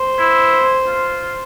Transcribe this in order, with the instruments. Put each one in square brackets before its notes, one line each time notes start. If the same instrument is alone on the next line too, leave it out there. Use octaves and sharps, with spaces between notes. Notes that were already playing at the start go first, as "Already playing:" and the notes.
Already playing: [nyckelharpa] C5
[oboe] E4
F4